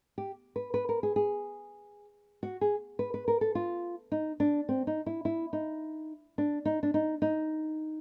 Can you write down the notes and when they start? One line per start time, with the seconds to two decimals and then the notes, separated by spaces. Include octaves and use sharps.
0.18 G4
0.56 B4
0.74 B4
0.89 A#4
1.03 G#4
1.16 G#4
2.43 F#4
2.61 G#4
2.99 B4
3.14 B4
3.28 A#4
3.41 A4
3.55 F4
4.12 D#4
4.40 D4
4.69 C4
4.87 D#4
5.06 E4
5.25 E4
5.53 D#4
6.38 D4
6.65 D#4
6.83 D4
6.94 D#4
7.22 D#4